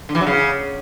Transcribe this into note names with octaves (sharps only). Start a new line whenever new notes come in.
D3
E3
F#3
C#3